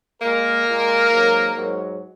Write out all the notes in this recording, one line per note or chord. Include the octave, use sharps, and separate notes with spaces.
A#2 G#3 A#3 A#4
A#2 G#3
G#2 F#3
G#2 F#3